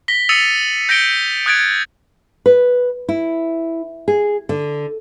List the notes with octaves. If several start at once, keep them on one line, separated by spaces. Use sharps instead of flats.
A#6 B6 G7
D#6 E6 A6 C#7 D#7 F7
G6 A#6 C#7 D7 G7
D#6 F#6 G#6 A6 D7
B4
E4
G#4
D3